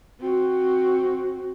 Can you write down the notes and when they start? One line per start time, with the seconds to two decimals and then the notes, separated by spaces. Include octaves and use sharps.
0.20 C4 F#4